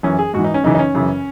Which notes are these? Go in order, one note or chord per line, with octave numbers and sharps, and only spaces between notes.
F#2 E3 C#4
G#4
G#2 F#4
E3
D#4
C#4
F#2 C#3 E3 D#4
D#4
C#4
F#2 C#3 E3